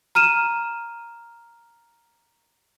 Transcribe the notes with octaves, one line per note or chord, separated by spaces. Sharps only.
A#5 F6 D#7 E7